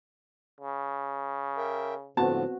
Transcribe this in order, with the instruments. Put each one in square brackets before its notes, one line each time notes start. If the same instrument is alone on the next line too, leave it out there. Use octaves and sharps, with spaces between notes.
[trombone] C#3
[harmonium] A#4 E5 G5
[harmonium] A2 D3 F3 [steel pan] B3 C4 F#4 [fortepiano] A5